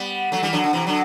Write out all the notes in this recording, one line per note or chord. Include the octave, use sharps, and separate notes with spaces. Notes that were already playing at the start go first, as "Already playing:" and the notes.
Already playing: G3 B3
F#3 A3
E3 G3
D3 F#3
D3
C3 E3
D3 F#3